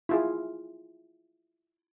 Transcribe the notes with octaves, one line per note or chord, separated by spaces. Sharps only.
E4 F4 G#4